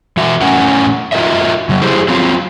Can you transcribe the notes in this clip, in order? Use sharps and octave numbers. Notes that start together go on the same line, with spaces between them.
E3 F#4 E5
A2 C#4 A#4 F#5 G#5
F4 F#4 A4 A#4 D#5 E5
C#3 F#3
E4 G4 G#4 C5
F#3 C4 F4